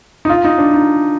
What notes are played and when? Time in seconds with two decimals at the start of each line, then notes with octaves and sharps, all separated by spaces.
0.25 D#4
0.29 F4
0.45 D#4
0.58 D4
0.74 D#4